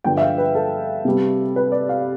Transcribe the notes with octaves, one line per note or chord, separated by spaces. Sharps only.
G2 D3 F3 B3 G5
E5
F5
B4
A4
C3 G3 B3
B4
D5
F5